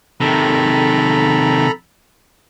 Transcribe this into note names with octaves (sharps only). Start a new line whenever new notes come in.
C3 D#3 A4 A#5 B5